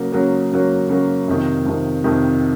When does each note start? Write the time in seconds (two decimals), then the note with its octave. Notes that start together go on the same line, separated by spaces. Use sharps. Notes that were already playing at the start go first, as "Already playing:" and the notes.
Already playing: C#3 F#3 A#3
0.12 C#3 F#3 A#3
0.51 C#3 F#3 A#3
0.89 C#3 F#3 A#3
1.28 F2 C3 D#3
1.65 F2 C3 D#3
2.04 F2 C3 D#3